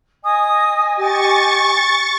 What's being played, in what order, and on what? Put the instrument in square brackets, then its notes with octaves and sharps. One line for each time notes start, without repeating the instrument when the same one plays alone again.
[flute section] D#5 G#5 [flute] D#6
[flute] G4 [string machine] C#6 A6